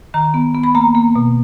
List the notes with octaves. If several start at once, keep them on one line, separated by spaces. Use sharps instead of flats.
D#3 A#5
B3
B3
B5
A#3 A#5
A#3
B2